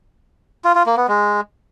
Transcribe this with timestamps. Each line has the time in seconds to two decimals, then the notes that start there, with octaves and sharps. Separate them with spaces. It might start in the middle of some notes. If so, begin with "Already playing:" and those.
0.65 F4
0.75 F4
0.86 A#3
0.97 B3
1.08 G#3